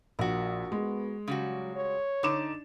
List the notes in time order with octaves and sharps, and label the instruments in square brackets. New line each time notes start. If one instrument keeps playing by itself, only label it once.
[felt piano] A#1 [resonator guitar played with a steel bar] F#4 A#4
[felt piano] G#3 [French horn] B3
[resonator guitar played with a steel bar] C#3 G3 F#4 [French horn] F#3
[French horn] C#5
[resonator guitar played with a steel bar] D3 [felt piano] D#4 D6 E7